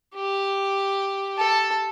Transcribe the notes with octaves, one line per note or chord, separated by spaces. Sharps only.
G4
A4